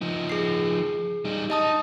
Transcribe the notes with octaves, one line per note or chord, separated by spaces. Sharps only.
F3 D#4
G#4 C7
G3 D#4
D#4 D#5 A5 D#6